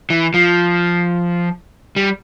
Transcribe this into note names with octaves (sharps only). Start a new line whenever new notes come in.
E3
F3
G3